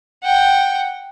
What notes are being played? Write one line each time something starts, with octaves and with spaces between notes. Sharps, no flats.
F#5 G5